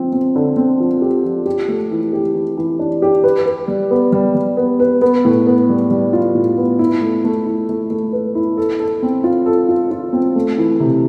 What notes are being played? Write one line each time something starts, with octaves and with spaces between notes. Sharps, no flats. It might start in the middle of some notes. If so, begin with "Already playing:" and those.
Already playing: F3 C4
C4
D3
C4
F3
G4
F3
G4
A3
E3
G4
E3
E3
D4
G4
B4
B4
G3
B3
G3
G3
B3
B4
B3
A2
B3
G3
G3
F4
A2
B3
E4
A3
A3
E4
A3
A3
B4
E4
A4
A4
C4
F4
A4
F4
F4
C4
A3
E3
C3